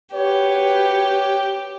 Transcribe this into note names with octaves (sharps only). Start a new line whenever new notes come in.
F#4 G4 B4 C#5